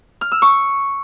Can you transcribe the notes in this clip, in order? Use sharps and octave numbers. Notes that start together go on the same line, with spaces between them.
F6
E6
C#6